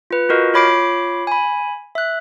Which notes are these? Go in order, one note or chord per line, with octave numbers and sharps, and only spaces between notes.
F4 B4
F4 F#4 A#4 D#5
F4 C#5 B5 D6 C7 D7
G#5 B5
E5 F#6